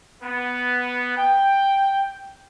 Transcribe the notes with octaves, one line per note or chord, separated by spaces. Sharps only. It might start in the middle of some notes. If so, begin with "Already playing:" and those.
B3
G5